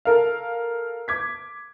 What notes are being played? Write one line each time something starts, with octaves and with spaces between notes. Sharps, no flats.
A4 A#4 F5
D6 G#6 B6